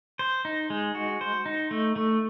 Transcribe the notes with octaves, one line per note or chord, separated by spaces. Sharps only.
C5
D#4
G#3
F#4
C5
D#4
A3
A3